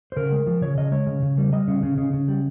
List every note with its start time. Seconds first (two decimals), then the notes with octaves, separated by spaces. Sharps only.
0.12 C5
0.17 C#3 A#4
0.32 G#3
0.47 F3
0.61 C#3 C#5
0.77 C#3 D#5
0.92 G#3 C#5
1.07 C#3
1.22 C#3
1.38 G3
1.53 G3 D#5
1.68 C#3
1.83 C#3
1.98 C#3
2.13 C#3
2.28 G3